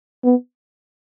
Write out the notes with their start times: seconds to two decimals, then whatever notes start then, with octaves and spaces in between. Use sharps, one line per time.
0.24 B3